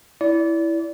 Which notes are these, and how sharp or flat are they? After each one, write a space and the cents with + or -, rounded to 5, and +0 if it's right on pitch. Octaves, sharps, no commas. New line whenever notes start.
E4 +0 D5 -30